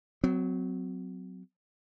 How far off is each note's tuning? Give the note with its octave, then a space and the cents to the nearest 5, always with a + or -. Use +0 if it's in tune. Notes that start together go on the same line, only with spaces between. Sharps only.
F#3 +0 C4 -30